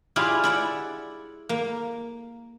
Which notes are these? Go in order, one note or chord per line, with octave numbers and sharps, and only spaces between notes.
E4 F4 G4 G#4 D5 F5
E4 D5 F#5
A#3